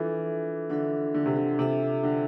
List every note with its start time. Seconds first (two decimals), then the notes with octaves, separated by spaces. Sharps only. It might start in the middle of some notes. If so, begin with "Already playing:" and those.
Already playing: E3 D4 F4 A4 E5
0.70 D3 D4 F4 A4 E5
1.14 D3
1.26 C3
1.37 D3
1.59 C3 D4 F4 A4 E5
2.03 D3